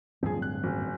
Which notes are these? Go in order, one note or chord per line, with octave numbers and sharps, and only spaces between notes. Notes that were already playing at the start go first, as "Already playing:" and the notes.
D1 G2 F3 C4 G#4
F#6
F#1